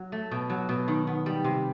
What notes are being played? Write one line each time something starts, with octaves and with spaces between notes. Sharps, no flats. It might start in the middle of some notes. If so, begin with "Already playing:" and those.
Already playing: F#3
A3
B2
F#3
B2
D#3
B3
G3
C3